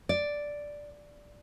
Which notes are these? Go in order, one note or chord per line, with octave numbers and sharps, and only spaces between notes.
D5